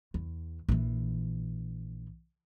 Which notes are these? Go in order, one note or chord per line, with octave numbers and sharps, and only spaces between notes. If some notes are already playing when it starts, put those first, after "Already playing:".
E2
A#1 E3